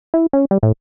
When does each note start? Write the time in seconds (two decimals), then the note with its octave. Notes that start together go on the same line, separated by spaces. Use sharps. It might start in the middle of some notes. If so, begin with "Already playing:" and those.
0.14 E4
0.33 C#4
0.51 G3
0.63 A2